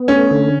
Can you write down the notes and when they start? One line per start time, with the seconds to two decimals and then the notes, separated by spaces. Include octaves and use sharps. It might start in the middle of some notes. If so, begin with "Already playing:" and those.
Already playing: B3
0.08 A3 C#4
0.31 D3